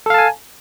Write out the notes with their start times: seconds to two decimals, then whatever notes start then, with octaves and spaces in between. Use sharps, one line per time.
0.06 A4
0.10 F5
0.14 A5
0.18 G#5